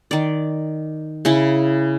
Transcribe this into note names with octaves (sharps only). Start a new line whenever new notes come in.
D#3 D5
C#3 C#4 E4